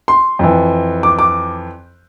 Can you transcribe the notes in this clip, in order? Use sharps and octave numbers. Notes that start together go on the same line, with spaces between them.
C6
F2 E3
D6
D6